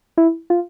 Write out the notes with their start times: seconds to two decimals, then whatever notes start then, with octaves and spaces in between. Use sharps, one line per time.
0.18 E4
0.50 F4